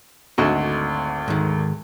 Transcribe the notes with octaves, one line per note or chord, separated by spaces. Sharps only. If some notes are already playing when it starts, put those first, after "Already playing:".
G#1 D2 F#4 A4 D#5
G#2 D#3